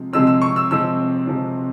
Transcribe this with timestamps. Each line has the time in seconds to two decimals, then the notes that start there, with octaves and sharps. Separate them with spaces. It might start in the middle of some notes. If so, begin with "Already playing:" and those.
Already playing: C3 F3 G#3 C4
0.13 C3 F3 G#3 C4 E6
0.27 E6
0.42 C#6
0.56 E6
0.71 C3 F3 G#3 C4 E6
1.27 C3 F3 G#3 C4